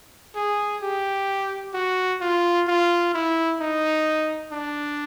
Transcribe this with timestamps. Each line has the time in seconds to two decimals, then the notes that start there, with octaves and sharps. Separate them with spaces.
0.35 G#4
0.82 G4
1.74 F#4
2.21 F4
2.68 F4
3.14 E4
3.60 D#4
4.52 D4